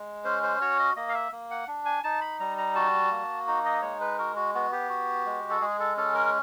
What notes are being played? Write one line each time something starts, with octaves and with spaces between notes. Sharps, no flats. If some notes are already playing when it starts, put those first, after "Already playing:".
Already playing: G#3
C#4 C5
C5
F#4 C#5
D#5
A#3 D#5
F5
E5
A#3
F#5
D4
G#5
D#4 A5
B5
G3 A#5
A#5
F#4 A5
A#3
D#4
D#5
G#3 C#5
B4
F#4 A#4
F#4
B3 F#4
G4
F#4
G#3
A4
G#3 G#4
A4
C#4 A4
A#4